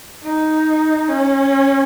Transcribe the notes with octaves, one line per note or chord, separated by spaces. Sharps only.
D#4
C#4